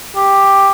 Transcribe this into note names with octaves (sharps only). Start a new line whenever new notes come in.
G4